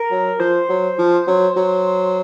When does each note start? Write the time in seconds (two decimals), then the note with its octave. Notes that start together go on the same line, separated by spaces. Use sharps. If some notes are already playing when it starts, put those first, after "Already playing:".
Already playing: A#4
0.11 F#3
0.40 F3 C5
0.69 F#3
0.98 F3
1.28 F#3
1.56 F#3